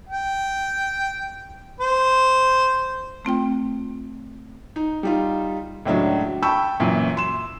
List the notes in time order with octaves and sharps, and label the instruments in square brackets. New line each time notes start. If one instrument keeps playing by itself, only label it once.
[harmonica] G5
C5
[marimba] A3 C4 F4 G5
[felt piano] D#4
G3 D#4 F4
C#2 A2 F#3 D4
G5 A5 B5 C#6 E6 G6
F#2 A#2 E3
C6 E7